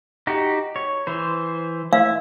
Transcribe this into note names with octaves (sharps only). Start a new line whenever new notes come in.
D#4 F#4 G4
C#5
E3 C5
E4 F5